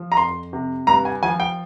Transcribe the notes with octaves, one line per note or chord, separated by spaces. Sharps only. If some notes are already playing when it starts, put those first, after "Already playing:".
Already playing: F3
A#5
F2 C6
C3
G2 A#5
G#5
F3 G#5
G5